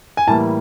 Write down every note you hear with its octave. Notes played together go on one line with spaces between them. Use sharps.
G#5
A2 E3 G3 A#3 A5